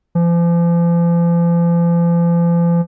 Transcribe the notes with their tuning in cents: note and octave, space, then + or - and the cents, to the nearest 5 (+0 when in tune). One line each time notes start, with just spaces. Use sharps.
F3 -40